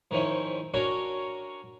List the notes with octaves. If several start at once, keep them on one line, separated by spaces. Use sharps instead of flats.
G#2 D#3 F3 C#4 E4
C#4 D4 F#4 A#4 C#5